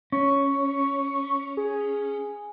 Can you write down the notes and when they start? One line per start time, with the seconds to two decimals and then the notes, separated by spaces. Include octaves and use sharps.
0.12 C#4 C#6
1.57 G#4